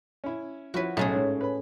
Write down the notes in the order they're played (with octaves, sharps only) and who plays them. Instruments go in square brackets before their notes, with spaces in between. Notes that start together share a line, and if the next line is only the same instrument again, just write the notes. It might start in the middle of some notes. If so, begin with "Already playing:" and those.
[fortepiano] C#4 E4
[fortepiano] F3 E4 C#5 [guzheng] F#4 B4
[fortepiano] B1 [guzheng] A2 C#4 G#4
[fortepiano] G#2
B4 B5